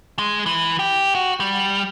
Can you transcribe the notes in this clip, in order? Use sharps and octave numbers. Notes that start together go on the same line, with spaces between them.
G#3
E3
G4
F#4
G3